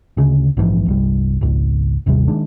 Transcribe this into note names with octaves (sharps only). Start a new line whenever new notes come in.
D2 C#3
A#1 G#2 E3 F3
G1 C2 G3
G#1 C#2
G#1 D#2 C3 G3
D#3 G#3 D4